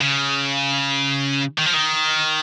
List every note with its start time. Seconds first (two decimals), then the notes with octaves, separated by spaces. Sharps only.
0.01 C#3
1.58 D#3
1.66 F3
1.73 D#3